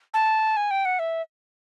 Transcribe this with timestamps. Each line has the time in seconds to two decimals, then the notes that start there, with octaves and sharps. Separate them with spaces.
0.14 A5
0.57 G#5
0.71 G5
0.85 F#5
0.99 E5